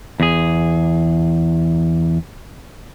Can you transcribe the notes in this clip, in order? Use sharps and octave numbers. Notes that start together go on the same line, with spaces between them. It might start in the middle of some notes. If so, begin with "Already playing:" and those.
E2 G#4